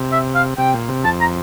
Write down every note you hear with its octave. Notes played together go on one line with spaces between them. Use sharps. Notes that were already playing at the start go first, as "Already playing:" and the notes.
Already playing: C3
E5
F5
C3 G5
A#2
C3
F2 A5
A#5